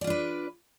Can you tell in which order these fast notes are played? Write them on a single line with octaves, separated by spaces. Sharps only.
D5 F4 D4 B4